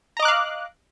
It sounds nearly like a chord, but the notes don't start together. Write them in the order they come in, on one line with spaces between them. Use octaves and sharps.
A#5 D#5 D6 F#6 F5